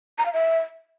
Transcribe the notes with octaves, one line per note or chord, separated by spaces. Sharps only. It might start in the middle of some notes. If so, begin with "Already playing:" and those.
A#5
F5
E5